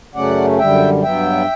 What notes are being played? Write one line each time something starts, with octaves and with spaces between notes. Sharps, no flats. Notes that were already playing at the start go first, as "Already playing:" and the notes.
F#2 C#3 F#3 A3 C#4 D5 F#5
F#2 D3 G3 E5 G5
G2 F#3 B3 E5 G5